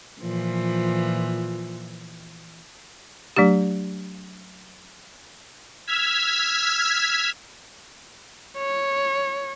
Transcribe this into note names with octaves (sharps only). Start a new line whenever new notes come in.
A#2 E3 F3
F#3 A3 D4 G4
E6 F6 G#6 B6
C#5